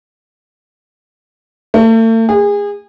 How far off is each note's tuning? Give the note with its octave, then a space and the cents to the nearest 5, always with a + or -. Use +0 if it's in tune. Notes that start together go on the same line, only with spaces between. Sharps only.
A3 +40
G#4 -30